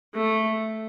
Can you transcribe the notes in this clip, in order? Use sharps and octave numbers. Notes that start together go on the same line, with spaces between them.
A3